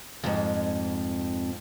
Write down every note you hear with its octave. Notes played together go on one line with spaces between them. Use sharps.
F2 G#2